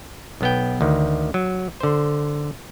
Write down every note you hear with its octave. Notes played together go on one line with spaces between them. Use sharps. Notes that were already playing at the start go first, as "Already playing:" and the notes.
B1 B3 G5
D2 D#3
F#3
D3 C5